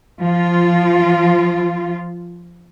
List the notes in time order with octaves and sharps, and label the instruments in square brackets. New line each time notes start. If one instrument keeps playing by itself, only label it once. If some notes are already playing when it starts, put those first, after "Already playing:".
[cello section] F3 F4